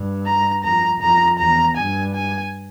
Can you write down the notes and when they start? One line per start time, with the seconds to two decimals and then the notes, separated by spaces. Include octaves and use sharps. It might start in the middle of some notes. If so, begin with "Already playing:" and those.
Already playing: G2
0.26 A#5
0.64 F2 A#5
1.01 F2 A#5
1.39 E2 A#5
1.77 G2 G#5
2.14 G#5